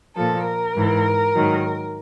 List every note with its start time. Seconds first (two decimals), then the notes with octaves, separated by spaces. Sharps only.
0.16 A#2 F3 A4
0.45 A#4
0.75 G#2 E3
1.34 G#2 D#3 F#3